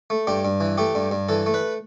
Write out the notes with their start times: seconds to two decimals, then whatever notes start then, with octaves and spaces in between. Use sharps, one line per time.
0.10 A3
0.27 G2 G4
0.45 G2
0.61 E3
0.78 A3 G4
0.95 G2
1.11 G2
1.29 E3 A4
1.46 A3
1.54 B4